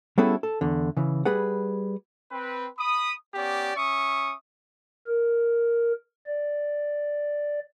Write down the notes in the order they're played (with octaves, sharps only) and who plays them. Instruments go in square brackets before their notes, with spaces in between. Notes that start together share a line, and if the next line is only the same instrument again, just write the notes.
[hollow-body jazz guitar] G3 B3 C#4 E4 G#4 A4
A4
E2 D3
C#3 E3
G3 G#4 B4 F#5
[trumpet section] C4 B4
B5 D#6
B3 C#4 G4 D5
C#4 E5 C#6 D#6
[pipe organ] A#4
D5